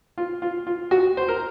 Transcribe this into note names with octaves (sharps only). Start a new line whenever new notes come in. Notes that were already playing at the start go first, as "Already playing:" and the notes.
F4
F4
F4
F#4
C5
A#4